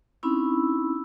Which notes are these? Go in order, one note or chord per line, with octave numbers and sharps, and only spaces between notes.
C4 C#4 D#4 E4 B5 E6